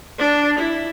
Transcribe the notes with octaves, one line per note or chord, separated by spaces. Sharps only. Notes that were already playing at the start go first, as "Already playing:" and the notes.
D4
E4